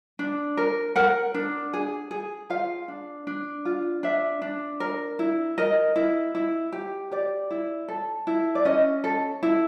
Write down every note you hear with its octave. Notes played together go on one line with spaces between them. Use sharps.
D4
A#4
A#4 F#5
D4
G#4
G#4
F4 F5
D4
D4
F4
D4 E5
D4
A#4
E4
A#4 D#5
E4
E4
G4
G4 D5
E4
A4
E4
D5
C#4 D#5
A4
E4